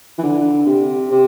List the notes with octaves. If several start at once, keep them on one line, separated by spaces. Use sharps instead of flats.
E3
D3
C3
C3